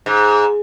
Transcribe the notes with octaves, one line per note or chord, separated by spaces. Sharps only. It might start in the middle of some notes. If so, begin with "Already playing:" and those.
G#2